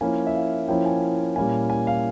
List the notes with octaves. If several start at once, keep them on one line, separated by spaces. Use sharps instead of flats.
F3 A#3 C#4 E4 G#5
E5
F5
F3 A#3 C#4 E4 G5
G#5
A#2 G3 A#3 C#4 E4 G#5
G#5
F5